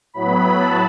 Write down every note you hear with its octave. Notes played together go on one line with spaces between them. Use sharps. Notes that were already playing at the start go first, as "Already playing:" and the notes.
A2 F#3 B3 B5
A5